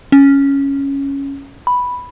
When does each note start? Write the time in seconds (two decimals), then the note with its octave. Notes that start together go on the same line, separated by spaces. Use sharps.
0.12 C#4
1.67 B5